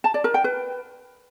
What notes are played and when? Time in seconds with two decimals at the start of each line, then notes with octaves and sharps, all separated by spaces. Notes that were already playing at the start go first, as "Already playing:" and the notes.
0.04 A5
0.14 D5
0.24 A#4
0.34 G5
0.44 B4